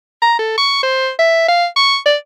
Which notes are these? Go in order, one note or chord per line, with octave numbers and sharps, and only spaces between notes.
A#5
A4
C#6
C5
E5
F5
C#6
D5